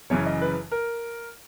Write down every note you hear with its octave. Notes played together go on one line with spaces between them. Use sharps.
F#1 F#2 C#3 E3 C#5
D#5
B4
A#4